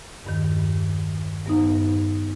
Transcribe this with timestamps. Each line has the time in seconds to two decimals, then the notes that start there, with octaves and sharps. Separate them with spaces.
0.24 E2 G2 D#3
1.46 G2 B3 D#4